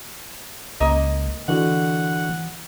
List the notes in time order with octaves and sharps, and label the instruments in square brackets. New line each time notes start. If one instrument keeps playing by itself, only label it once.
[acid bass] C#2 [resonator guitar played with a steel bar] A#3 D#5
[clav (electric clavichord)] D3 F#4 [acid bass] E3 [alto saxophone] F#5